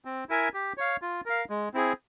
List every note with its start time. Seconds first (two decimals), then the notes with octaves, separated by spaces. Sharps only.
0.05 C4
0.29 E4 A#4 E5 G#5
0.54 G4
0.77 C#5 F5
1.02 F4
1.26 A#4 F5
1.50 G#3
1.74 C4 E4 G#4